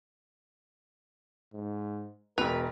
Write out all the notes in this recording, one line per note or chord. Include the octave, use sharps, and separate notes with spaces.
G#2
E1 B2 A#4 B4 F7